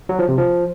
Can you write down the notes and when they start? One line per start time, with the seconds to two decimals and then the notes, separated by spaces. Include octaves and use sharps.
0.09 F#3
0.19 F3
0.28 C3
0.38 F3